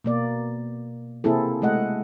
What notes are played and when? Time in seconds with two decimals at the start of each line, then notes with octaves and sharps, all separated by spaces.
0.04 B2 A#3 D5
1.24 C3 A#3 C4 E4 G#4 A4
1.62 G#3 A3 D#5 F#5